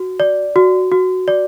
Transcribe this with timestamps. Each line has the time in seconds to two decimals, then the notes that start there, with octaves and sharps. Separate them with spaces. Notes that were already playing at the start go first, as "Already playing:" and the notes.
Already playing: F#4
0.20 D5
0.56 F#4
0.92 F#4
1.28 D5